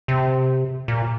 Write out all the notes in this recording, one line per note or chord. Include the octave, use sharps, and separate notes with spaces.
C3
A#2